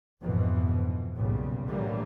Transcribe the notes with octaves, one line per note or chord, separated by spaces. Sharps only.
A#1 F2 G#2 B2 E3 F3
B1 A#2 C#3 G3
A2 D3 E3 F#3 G3 A#3